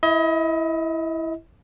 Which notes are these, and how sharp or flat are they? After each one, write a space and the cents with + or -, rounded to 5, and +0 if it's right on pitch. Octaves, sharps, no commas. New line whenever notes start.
E4 +0 D#5 +35